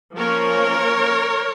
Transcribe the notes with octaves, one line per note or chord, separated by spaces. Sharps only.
F3 A#3 C#4 A#4 C#5